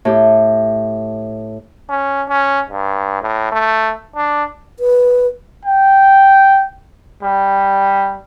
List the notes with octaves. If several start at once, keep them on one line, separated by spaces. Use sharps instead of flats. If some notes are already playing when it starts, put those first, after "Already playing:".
A2 G4
C#4
C#4
G2
A2
A3
D4
B4
G5
G3